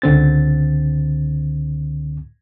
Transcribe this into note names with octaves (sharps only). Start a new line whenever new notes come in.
C#2 D3 C4 A6